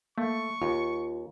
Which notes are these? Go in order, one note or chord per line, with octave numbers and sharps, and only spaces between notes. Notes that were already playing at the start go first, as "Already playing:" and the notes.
A3 A#3 C#6
D#2 F4